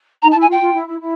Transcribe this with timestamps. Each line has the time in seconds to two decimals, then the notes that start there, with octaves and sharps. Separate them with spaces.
0.22 D#4 A#5
0.31 A5
0.35 E4
0.41 G#5
0.48 F4 G5
0.61 F4
0.74 E4
0.87 E4
1.00 E4